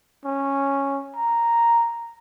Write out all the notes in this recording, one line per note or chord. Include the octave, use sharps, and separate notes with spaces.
C#4
A#5